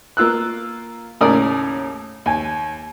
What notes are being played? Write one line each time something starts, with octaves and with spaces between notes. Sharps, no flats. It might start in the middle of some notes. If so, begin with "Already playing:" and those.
A#3 F4 E6 F#6
D#2 A2 C#3 A#4 D5 D#6
D#2 G#5